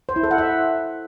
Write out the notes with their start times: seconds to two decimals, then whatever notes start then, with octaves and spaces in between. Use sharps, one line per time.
0.09 C5
0.16 E4
0.23 A4
0.31 F#5
0.38 E5